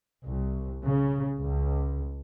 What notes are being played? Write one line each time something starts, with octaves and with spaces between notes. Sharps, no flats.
C2
C#3
C#2